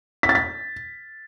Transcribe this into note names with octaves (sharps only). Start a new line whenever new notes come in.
B6
A6
B6